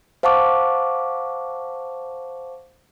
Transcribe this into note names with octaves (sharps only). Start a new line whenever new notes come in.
C5 F5 F#5 A5 C#6 D6